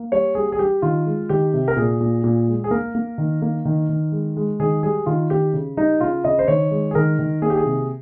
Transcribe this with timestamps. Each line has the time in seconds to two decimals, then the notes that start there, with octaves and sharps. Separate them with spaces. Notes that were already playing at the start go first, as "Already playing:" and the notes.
Already playing: A#3
0.12 G3 C#5
0.35 G3 G#4
0.52 G#4
0.59 G3 G4
0.82 D#3 F4
1.06 G#3
1.29 D#3 G4
1.54 C3
1.68 A#4
1.77 A#2 G#4
2.01 A#2
2.24 A#2
2.48 G#3
2.64 G#4
2.71 A#3 A#4
2.95 A#3
3.18 D#3
3.42 A#3
3.65 D#3
3.89 D#3
4.12 G#3
4.37 G#3
4.60 D#3 G#4
4.83 G3 G#4
5.06 D#3 F4
5.30 D#3 G4
5.54 C#3
5.77 G3 D#4
6.01 C#3 F4
6.24 C#3 D#5
6.39 C5
6.48 D#3 C#5
6.71 G#3
6.91 G#4
6.95 D#3 A#4
7.19 D#3
7.42 A#3 G#4
7.50 G4
7.57 G#4
7.66 C3